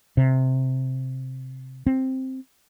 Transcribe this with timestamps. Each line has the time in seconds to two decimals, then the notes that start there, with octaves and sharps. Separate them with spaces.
0.17 C3
1.87 C4